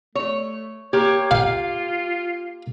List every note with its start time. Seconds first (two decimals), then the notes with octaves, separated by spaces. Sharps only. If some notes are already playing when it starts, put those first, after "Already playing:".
0.15 A3 C#5
0.93 A#3 G4 C#5
1.31 F4 F5